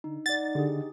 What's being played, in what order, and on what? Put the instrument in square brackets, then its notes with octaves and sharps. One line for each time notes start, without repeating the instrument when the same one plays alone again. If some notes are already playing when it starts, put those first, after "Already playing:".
[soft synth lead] D3 [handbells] D#4
[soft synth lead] D#4 [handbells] D5 F#5 [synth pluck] A6
[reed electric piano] D3 [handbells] G4 G#4